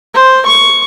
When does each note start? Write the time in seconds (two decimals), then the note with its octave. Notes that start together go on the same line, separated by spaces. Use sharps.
0.14 C5
0.46 C#6